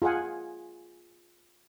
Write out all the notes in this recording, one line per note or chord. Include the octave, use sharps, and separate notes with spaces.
F4 G#4 F5 F#5 G#5